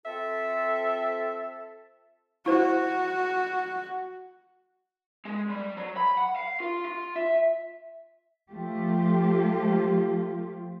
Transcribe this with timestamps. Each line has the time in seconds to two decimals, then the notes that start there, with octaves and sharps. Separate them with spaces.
0.05 C4 F4 A4 E5
2.46 E4 F#4 C5
5.25 G#3
5.50 G3
5.77 F#3
5.97 B5
6.17 F#5
6.36 F5
6.60 F4
6.85 F4
7.16 E5
8.51 F3 A3 F4 G4